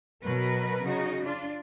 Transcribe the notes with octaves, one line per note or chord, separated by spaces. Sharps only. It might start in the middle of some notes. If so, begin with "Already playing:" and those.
B2 F#3 A#4 B4
C#3 D#4 F#4
D4 F4